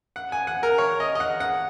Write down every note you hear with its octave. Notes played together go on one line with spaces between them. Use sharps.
F#5
G#5
F#5
A#4
C#5
D#5
D#5
F#5
F#5